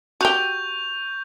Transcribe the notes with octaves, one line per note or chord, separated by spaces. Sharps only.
F#4 G4 C#6 G6 F7